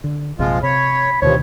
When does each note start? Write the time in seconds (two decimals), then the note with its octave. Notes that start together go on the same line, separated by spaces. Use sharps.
0.04 D3
0.39 A#1 F#2 C3 F3 G#3 F4
0.63 C3 C#5 B5
1.22 D2 G2 B2 D#3 F3 C#5